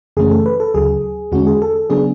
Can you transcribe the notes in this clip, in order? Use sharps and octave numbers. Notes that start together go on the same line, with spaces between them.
F#2 C#3 E3 A3 C#4 G#4
A4
B4
A4
D2 C#3 F#3 G#4
E2 D3 G#3 C#4 F#4
G#4
A4
C#3 F#3 B3 D4 G#4